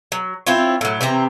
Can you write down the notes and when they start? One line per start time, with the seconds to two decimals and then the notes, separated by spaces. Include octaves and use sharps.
0.12 F#3
0.47 C4 E4 F4 C#5
0.81 A2 F#3
1.01 C3 E3 C4 A#5